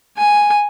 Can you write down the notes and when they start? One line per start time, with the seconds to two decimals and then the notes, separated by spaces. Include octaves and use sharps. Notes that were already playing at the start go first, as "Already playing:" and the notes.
0.18 G#5